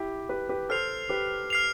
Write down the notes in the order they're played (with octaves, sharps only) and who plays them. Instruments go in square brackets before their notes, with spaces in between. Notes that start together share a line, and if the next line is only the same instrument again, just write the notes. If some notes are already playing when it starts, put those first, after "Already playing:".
Already playing: [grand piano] E4 G4
G4 B4
G4 B4
[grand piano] A4 C5 [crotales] F6 C7 F7
[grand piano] G4 B4
[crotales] F6 C7 F7